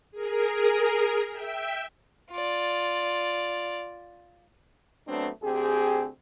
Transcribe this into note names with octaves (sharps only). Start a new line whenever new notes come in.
G#4 A#4
E5 G5
F4 D5
F#3 A3 B3 C4 D4
D2 C4 G4 G#4